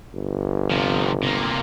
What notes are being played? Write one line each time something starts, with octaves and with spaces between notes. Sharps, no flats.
G1
C3 F3
C3 A#3